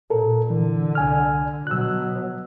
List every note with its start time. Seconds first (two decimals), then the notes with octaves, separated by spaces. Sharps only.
0.10 A#2 A4 A#4
0.50 D3 E3
0.95 C2 G#5 F6
1.67 B2 F#3 E6 F#6